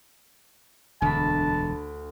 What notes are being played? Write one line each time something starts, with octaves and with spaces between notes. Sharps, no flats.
E1 D2 A5 B5